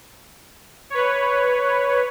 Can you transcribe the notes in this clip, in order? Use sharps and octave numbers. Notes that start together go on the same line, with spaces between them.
B4 C#5